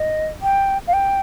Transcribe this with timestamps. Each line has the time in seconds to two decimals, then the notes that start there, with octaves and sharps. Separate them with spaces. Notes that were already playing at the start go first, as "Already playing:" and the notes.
Already playing: D#5
0.42 G5
0.87 F5
0.93 G5